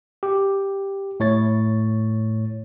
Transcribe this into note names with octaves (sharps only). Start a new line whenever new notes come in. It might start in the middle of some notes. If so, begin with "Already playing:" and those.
G4
A2 C#5 A6